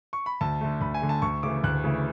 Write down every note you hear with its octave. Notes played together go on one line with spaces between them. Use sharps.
C#6
B5
D2 A5
D3 A3
D2 B5
G#5
D3 A3
A5
D2 C#6
C#3 E3 A3 D6
D2 F#6
C#3 E3 A3